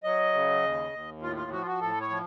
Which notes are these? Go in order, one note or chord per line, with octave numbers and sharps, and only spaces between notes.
F#3 D#5
C#3
D#2
D#2
A2 F4
F4
F3 F#4
F4
F#4
A2 A4
C#5
F3